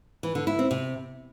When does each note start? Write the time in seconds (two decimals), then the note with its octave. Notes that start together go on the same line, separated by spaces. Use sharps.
0.23 E3
0.35 D3
0.47 E4
0.59 C4
0.71 C3